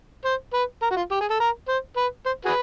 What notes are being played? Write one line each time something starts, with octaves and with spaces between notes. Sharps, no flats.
C5
B4
A#4
F#4
F4
G4
G#4
A4
A#4
C5
B4
C5
F#4 G#4 B4